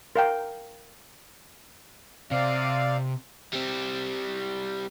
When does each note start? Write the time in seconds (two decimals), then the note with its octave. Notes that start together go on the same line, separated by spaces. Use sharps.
0.16 A#4 F5 G5
2.31 C3 C4 D5 F5
3.53 G3 C4